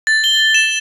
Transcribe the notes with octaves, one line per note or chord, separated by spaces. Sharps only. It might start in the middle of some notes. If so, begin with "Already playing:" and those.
A6
G7
E7